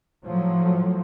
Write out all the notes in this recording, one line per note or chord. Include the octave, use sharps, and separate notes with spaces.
A2 F3 F#3